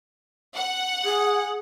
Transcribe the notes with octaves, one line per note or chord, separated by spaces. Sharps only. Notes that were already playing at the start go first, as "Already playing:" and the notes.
F#5
G#4